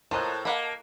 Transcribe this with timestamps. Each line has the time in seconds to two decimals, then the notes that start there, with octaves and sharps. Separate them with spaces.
0.11 A2 F4 A#4 C5 D#5 A5 A#5 F#6
0.45 A#3 D#5 F5 F#5 B5